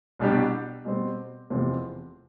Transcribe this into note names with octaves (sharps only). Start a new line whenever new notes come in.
C2 B2 G3 D4 G4
B2 G3 C4
F1 E2 C3 F3 C4